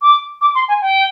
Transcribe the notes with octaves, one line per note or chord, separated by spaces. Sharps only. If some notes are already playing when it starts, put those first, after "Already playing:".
D6
D6
C6
G#5
G5